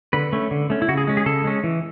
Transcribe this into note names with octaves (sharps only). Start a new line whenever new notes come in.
D3 B4
A3 C#4
D3
A3 C#4
E4
C#3 F#4
G#4
G#3 C#4
G#4
C#3 A4
G#3 C#4
E3